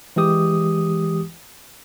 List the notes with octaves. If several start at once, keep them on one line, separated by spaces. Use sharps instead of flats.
E3 G#3 G4 D#6